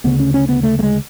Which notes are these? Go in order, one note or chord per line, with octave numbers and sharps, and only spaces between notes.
D2 C#3 B3
C#4
C#4
B3
A3
A3
G#3